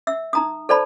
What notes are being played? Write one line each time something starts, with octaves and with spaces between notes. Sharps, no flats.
E5 E6
D#4 A#5 D#6
A4 C5 D5 A5 B5